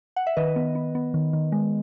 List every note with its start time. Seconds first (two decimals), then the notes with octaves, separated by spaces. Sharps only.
0.16 F#5
0.27 E5
0.37 D#3 B4 D#5
0.56 B3
0.75 B3
0.95 B3
1.14 D#3
1.33 D#3
1.52 G#3